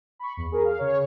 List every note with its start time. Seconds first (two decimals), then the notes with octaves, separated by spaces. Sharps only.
0.19 B5 C#6
0.37 E2
0.52 G#4 A#4
0.65 F5
0.79 C#3 C#5